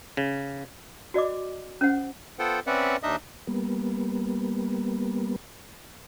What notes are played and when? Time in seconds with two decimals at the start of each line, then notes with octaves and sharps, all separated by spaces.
0.17 C#3
1.14 F#4 D5 D#5 D6
1.81 C#4 C5 F#5
2.39 B3 F4 A4 C5 F#5 G5
2.67 C4 C#4 B4 D5 E5 F#5
3.03 D#2 D4 D#4 D#5 E5 D#6
3.47 G3 A#3 B3